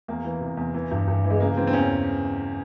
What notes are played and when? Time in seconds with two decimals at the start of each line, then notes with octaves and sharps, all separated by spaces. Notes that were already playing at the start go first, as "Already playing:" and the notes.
0.08 E2 A#3
0.25 E3
0.41 C3
0.57 E2
0.74 E3
0.91 G2
1.08 G2
1.24 E3
1.30 G#3
1.40 C#3 A#3
1.56 E3 C4
1.67 C4
1.73 E2 C#4